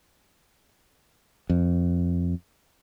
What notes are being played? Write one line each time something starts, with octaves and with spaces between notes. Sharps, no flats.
F2